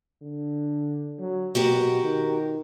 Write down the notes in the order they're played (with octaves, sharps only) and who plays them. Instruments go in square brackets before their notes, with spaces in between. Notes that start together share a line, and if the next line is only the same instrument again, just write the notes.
[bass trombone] D3
F#3
[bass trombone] B2 [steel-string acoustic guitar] F#4 G4 A#4
[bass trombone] D#3